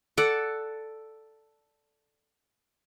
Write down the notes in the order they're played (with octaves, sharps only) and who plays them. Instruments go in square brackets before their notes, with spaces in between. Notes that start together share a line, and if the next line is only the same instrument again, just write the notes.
[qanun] A4 D5 F#5